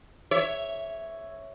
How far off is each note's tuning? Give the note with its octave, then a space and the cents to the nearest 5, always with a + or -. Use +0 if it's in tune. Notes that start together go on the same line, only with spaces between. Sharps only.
C#5 +0 E5 +0